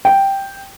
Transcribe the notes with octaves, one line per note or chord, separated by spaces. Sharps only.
G5